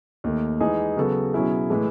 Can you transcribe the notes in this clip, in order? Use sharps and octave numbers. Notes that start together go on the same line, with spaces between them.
D#2 D#3 A3
E3 G#3 D#4 G#4
C#3 F#3 B3 F#4 A4
B2 F#3 C#4 E4 G#4
A2 E3 G#3